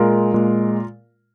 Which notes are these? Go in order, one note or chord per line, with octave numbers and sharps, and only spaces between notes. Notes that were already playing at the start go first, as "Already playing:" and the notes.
Already playing: A#2 G#3 F4 A#4
A#2 G#3